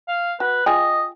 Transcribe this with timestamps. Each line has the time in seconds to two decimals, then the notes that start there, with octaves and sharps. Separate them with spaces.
0.08 F5
0.40 F#4 B4
0.66 F4 G#4 D#5 G5